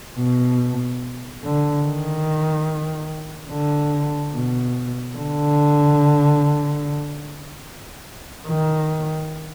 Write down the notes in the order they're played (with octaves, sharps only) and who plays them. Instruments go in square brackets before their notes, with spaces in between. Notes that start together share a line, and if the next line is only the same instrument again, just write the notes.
[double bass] B2
D3
D#3
D3
B2
D3
D#3